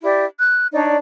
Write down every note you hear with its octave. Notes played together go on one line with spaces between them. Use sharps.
E4 G4 D5
F#6
D4 D#4 C#5 D5